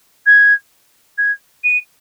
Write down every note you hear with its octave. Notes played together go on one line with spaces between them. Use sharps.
G#6
G#6
D#7